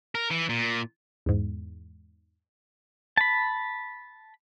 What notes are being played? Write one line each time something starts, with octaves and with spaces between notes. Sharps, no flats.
A#4
E3
A#2
E2 G#2
A5 B5